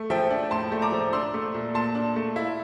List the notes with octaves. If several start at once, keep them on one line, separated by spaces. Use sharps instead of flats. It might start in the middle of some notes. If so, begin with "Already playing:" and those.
Already playing: A3
F3 E5 G5
D4
A2 A5 C6
A3
A#5 D6
F3
D4 C6 E6
A3
A#2
A#2 A5 C6
D4
A3
E4